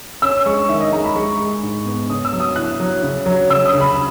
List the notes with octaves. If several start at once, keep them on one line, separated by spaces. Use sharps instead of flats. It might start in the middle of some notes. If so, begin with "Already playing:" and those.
C#4 E6
G#3 C#6
D#3 E5
D#5
G#3 A#5
B5
G#3 C#6
G#3
G#2
B3
C#3 D#6
E6
F#3
D#6
E4 F#6
F#3
C#3
F#3
C#3 E6
D#6
C#3
B5